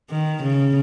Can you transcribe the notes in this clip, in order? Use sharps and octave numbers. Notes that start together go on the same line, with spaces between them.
D#3
C#3